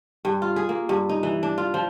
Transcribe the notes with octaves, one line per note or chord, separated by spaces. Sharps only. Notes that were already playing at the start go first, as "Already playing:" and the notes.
G2
F4
G#4
A#3
G2
D#4
E3
D4
F4
F3